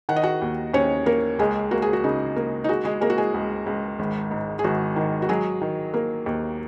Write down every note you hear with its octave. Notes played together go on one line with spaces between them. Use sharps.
D#3 F#5
D#5
F#4 F#5
D#2
D#2 C#4 C#5
A#3 A#4
C#2 G#3 G#4
A#3 F#4
G#4
F#4
C#3 D#4
A#3
D#4
G#3 F#4
G#3 G#4
G#3 A#3 A#4
F#4
G#3 G#4
C#2
C#2
G#1
G#2
G#4
G#1 F#4
D#3
F#4
F#3 G#3 G#4
D#3
A#3
D#2